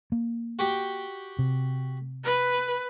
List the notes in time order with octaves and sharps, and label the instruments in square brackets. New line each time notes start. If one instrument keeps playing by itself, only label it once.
[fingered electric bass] A#3
[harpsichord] F#4 G4 G5
[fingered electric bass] C3
[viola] B4